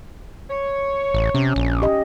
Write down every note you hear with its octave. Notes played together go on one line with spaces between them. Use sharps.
C#5
A1
C3 C#4
A#1
G4 D#5